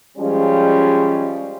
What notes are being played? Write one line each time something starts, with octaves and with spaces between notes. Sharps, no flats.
F3 G3 G#3 C#4